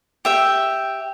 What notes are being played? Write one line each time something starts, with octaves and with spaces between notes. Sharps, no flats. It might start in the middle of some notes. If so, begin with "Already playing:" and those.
G4 E5 G5